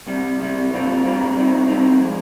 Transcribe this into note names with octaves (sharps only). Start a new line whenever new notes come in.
C2 C3 G3
C2 C3 G3
G2 G3 C4 F4
G2 G3 C4 F4
C3 G3 C4 D#4
C3 G3 C4 D#4
F3 G#3